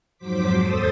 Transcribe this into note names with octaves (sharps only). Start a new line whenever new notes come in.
F2 G#2 F#3 C5 D6 B6
D#2 A4 C5 D#6 A6